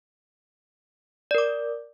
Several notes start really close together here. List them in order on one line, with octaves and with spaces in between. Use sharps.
D5 A#4 D6